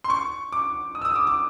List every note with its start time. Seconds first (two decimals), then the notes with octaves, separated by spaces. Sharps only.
0.04 C6
0.10 C#6
0.52 D6
0.95 D#6
1.02 E6
1.05 D#6
1.16 D6
1.27 D6